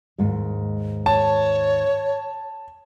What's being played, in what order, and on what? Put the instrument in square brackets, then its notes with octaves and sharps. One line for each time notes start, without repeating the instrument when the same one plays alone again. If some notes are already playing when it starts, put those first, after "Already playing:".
[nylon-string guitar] D#2 G#2 G#3
[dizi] C#5 [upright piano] A5